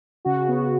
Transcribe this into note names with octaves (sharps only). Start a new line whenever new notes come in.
C#3 F#4
B3